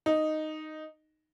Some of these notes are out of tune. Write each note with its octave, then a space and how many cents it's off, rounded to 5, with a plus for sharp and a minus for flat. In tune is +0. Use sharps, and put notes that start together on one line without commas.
D#4 -5